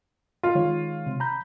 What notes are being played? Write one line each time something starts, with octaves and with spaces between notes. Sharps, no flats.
F4
D#3 G#3 C#5
C3
A#5 B5 G6